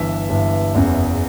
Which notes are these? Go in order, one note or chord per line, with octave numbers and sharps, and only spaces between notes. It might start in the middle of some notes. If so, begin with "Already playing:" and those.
Already playing: G1 G2 E3 E5
G1 G2 E3
F#1 E2 C#3